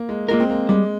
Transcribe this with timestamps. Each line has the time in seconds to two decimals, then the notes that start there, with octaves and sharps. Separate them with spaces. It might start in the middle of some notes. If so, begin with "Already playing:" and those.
Already playing: A#3
0.09 G#3
0.29 G#3 A#3 F4 A#4
0.40 C4
0.50 A#3
0.69 G3 G#3